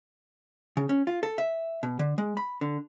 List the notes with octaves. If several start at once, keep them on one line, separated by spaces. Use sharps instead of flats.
C#3
C#4
F4
A4
E5
B2
D3
G#3
B5
D3